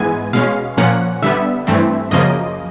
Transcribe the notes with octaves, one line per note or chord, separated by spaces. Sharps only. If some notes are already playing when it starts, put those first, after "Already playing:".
Already playing: G#2 E3 G#3 B3 G#5
B2 G#3 C#4 F5
A#2 F3 A#3 C#4 F#5
D3 G3 B3 E5
G2 E3 A3 C4
F#2 C#3 F3 A#3 D#5